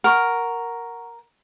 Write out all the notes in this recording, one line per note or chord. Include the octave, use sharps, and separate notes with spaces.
A#4 F#5 C#6